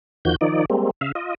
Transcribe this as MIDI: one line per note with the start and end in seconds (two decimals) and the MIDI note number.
0.25 0.36 40
0.25 0.36 51
0.25 0.36 53
0.25 0.36 66
0.25 0.36 91
0.41 0.65 51
0.41 0.65 53
0.41 0.65 63
0.41 0.65 74
0.70 0.91 55
0.70 0.91 56
0.70 0.91 58
0.70 0.91 60
1.01 1.12 49
1.01 1.12 76
1.01 1.12 77
1.15 1.34 65
1.15 1.34 75